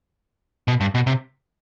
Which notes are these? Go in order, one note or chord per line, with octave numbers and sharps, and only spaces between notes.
B2
G2
B2
C3